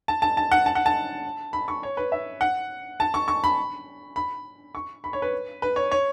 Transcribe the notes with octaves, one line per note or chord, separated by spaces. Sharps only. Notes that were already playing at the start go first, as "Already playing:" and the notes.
A5
A5
A5
F#5
A5
F#5
A5
B5
C#6
C#5
B4
E5
F#5
A5
C#6
C#6
B5
B5
C#6
B5
C#5
B4
B4
C#5
C#5